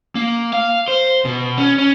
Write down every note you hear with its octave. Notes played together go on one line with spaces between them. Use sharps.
A#3
F5
C5
B2
C#4
C#4